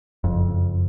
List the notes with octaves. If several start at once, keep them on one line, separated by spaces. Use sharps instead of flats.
F#1 F2